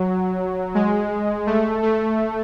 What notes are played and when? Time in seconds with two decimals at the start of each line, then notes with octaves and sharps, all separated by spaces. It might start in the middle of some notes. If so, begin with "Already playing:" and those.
Already playing: F#3
0.75 G#3
1.47 A3
1.83 A3